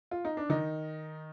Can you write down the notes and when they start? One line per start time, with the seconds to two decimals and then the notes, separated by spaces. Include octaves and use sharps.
0.11 F4
0.25 D#4
0.37 D4
0.49 D#3 D#4